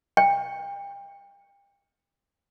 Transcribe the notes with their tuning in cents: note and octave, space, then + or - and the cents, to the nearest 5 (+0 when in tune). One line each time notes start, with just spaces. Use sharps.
G5 +30